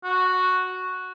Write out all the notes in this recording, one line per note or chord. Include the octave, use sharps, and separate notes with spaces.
F#4